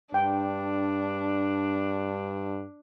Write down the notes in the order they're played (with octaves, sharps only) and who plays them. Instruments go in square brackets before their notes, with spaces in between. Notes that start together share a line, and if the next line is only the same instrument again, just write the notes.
[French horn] G2 [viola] D4 [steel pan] G5